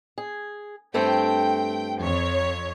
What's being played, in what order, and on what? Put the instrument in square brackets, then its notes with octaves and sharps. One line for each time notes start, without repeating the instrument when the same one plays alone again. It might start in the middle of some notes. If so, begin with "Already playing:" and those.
[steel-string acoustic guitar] G#4
[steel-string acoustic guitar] G2 A3 C4 [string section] G5
[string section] F2 C#5